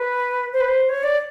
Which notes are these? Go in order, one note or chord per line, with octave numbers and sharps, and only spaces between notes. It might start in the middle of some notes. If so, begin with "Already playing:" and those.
Already playing: B4
C5
B4
C5
C#5
D5